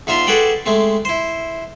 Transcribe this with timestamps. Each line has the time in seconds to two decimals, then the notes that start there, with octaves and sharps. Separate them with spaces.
0.07 E2 D#4 F4 E5 A#5 C6
0.27 F#4 G#4 A4 B4 D5 G5
0.66 G#3 A3 C4
1.05 E4 C5